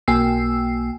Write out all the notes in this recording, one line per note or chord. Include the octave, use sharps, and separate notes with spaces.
B1 A#3 G5 G#5 E6 C7